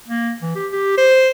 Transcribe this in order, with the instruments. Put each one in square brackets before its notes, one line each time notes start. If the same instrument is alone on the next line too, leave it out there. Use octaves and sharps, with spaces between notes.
[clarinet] A#3
E3
G4
G4
C5